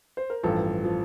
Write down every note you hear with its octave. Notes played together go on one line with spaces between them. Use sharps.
C5
A#4
A1 G2 F3 A4
F3